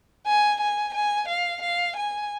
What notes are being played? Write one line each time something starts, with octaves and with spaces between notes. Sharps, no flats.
G#5
G#5
G#5
F5
F5
G#5